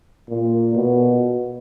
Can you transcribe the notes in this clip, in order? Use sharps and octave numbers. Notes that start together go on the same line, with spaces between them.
A#2
B2